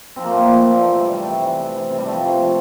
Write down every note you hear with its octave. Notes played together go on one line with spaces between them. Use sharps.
F3 C4
A#3
A#2 A3
A#3
F3
A#2
E3 A3
C3
G3
E3 G3
C3 A3
E3
C3
E3
C3
G3
F3 A3
C3
A3
F3